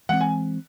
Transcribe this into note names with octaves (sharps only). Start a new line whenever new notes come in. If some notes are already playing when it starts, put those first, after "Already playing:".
E3 G#3 C4 F#5
G#5